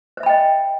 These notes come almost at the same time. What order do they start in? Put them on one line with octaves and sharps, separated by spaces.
C5 E5 B5 G5 D#5